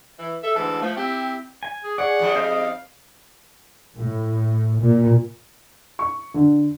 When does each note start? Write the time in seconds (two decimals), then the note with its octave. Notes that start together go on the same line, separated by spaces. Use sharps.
0.19 E3
0.43 A4 E5
0.56 D2 G#2 E3 A5
0.82 F3 A3
0.97 C4 E4 G4
1.63 G#5
1.84 G#4
1.98 G#4 C#5 D5 F#5
2.19 G#2 F3 G3
2.35 C4 D#5 F5 G6
3.97 A2
4.80 A#2
5.99 C#6
6.34 D3